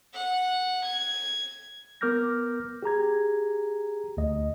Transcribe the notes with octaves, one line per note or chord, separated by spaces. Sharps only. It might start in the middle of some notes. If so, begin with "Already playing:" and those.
F#5
G#6
B3 A#4 D6 F6 G6 A#6
G4 G#4 A#5 G#6
D2 D#5